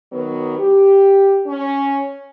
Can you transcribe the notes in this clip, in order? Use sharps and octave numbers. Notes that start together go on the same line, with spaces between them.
D#3 F#3 B3
G4
C#4